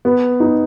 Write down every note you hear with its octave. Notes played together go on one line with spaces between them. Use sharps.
B3
D#4